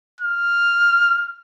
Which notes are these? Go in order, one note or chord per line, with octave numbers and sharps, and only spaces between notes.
F6